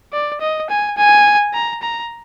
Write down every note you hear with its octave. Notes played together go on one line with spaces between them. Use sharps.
D5
D#5
G#5
G#5
A#5
A#5